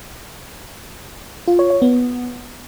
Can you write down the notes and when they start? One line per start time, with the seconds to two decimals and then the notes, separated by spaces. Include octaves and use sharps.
1.48 F4
1.59 C#5
1.70 C#5
1.82 B3